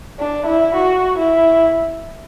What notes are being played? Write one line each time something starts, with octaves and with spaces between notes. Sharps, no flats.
D4
E4
F#4
E4